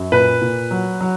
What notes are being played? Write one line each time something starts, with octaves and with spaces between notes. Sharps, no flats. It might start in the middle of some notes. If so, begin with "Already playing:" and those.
Already playing: F#2
A#2 B4
A#2
F#3
F#3